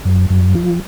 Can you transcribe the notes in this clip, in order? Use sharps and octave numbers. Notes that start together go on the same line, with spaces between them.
F#2
F#2
F3